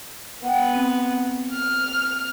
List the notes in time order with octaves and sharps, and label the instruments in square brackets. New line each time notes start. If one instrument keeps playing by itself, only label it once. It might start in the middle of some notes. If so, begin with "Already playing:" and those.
[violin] B3 [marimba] F#5 G5
[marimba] C4
[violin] F6